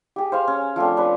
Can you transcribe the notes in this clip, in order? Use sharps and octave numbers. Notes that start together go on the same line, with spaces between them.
G4 G#4
C5 F5 G#5 C6
C#4
F3 A3 C4 D4
C#4 D4 B4 C#5